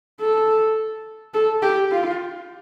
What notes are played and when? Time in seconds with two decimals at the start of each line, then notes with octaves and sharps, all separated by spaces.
0.20 A4
1.34 A4
1.63 G4
1.92 F4